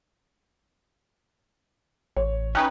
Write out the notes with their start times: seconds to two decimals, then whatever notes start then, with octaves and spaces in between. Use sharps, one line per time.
2.17 A1 C#5
2.55 C#4 D#4 B4 G5 F#6